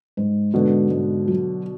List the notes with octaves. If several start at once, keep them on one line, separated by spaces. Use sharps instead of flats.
G#2
G#2 B2 D3
G#2
F#3